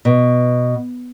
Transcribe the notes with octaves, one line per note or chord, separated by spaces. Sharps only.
B2